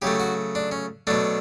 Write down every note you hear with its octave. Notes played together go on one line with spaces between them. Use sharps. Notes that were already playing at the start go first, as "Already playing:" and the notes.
C#3 F#3 A3 G4
F#4
D4
C#4
B2 F#3 A3 D4